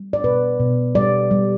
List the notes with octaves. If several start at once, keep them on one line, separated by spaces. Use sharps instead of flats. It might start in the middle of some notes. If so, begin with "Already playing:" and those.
Already playing: G3
D5
B2 B4
B2
G3 D5
G3